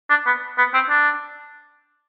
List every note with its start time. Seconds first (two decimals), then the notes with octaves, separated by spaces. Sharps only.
0.10 D4
0.26 B3
0.58 B3
0.74 C4
0.90 D4